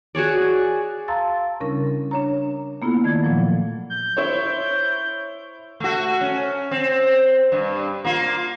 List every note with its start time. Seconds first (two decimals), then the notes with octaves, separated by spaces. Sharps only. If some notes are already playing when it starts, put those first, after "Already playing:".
0.15 F#4 G#4 C#5 D5
1.08 F5 A5 A#5 C6 E6 A6
1.60 C#3 G3 C#4 D4 E4 A#4
2.11 D4 C#5 A#5
2.82 A#3 B3 E4 F4 A4
3.04 D#3 A3 D5 G#6
3.23 A#2 F3 F#3
3.90 G6
4.17 E4 C5 C#5
5.80 A3 F#4
6.21 C#4
6.71 C4
7.52 G2
8.04 A#3 F4